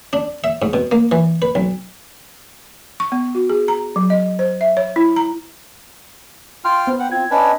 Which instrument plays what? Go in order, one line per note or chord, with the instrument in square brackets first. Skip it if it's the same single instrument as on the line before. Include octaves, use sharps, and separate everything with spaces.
[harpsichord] D4
E5
G#2
B2
A#3
E3
B4
B1
[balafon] C#6
B3
F#4
G#4
A#5
F#3
D#5
C5
E5
C#5
E4
A#5
[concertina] F4 G5 F6 [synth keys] C6
[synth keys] B3 [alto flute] C5
[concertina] F#5 [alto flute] G5
[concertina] C4 [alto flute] F4 [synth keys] G#6
[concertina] C#4 D4 B4 [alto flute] D#5